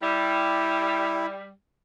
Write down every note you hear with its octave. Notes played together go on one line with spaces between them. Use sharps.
G3 E4